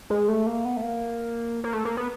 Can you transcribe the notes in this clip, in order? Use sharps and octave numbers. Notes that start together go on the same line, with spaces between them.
G#3
A3
A#3
B3
A3
A#3
A#3
A3
A#3
B3